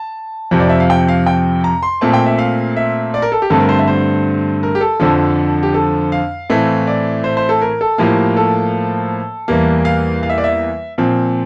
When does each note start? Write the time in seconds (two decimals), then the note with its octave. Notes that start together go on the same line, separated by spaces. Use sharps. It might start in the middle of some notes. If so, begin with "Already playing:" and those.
Already playing: A5
0.51 F2 C3 F3 C4
0.60 D5
0.69 E5
0.80 F5
0.90 G5
1.08 F5
1.26 G5
1.64 A#5
1.83 C6
2.01 A#2 A3 C4 A5
2.13 G5
2.26 E5
2.39 F5
2.76 E5
3.14 D5
3.22 A#4
3.32 A4
3.42 G4
3.50 G2 D3 A3 C4 A4
3.60 A#4
3.69 C5
3.79 E5
3.87 C5
4.63 A#4
4.75 G4
4.81 A4
5.00 F2 D3 F3 A4
5.63 G4
5.74 A4
6.12 F5
6.50 A2 E3 A3 C4
6.87 D5
7.24 C5
7.37 C5
7.49 A4
7.61 A#4
7.81 A4
7.98 A2 F3 A#3 G4
8.37 A4
9.48 E2 E3 G3 A#3
9.85 F5
10.23 F5
10.29 E5
10.38 D5
10.44 E5
10.98 A#2 F3 C4